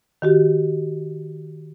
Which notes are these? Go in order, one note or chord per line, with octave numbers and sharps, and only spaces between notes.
D#3 F#4 G4